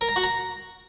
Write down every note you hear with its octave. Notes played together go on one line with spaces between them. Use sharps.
A#4
A#5
F#4
A#5